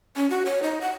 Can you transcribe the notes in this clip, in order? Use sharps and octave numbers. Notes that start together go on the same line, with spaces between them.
C#4
F#4
C#5
D#4
F#5